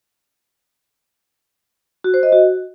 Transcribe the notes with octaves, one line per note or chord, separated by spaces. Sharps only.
F#4
C5
D#5
F#4